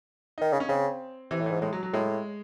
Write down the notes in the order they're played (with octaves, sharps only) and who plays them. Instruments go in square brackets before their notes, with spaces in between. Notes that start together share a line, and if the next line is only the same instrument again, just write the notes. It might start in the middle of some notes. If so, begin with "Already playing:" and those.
[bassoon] D#3 [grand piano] D#4
[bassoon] C#3
[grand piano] C#4
[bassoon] C#3 [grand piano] C4
[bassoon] C3 [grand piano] E3
[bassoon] A2
[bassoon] G#2 [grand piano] E3
[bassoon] A2 [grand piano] G#3
[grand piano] F#3
F#3
[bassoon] A2 [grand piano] G#3